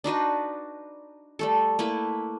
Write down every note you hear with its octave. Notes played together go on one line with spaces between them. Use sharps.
D4 D#4 F#4 B4
G3 A3 A4
A3 A#3 E4 B4